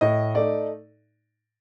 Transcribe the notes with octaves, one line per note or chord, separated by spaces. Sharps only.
A2 D#5
A3 D#4 D5